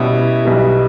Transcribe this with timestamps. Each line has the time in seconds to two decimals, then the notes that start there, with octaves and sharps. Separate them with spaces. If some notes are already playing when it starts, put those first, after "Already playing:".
Already playing: B2 G3 C#4 E4 G4
0.45 B1 B2 G3